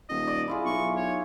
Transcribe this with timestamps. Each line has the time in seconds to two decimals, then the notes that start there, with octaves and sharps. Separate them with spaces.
0.09 D#1 D#5
0.27 D5
0.48 E4 F4 G#4
0.65 B1 C#6
0.96 C#5